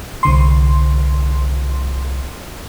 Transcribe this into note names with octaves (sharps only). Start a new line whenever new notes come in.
C2 D3 C6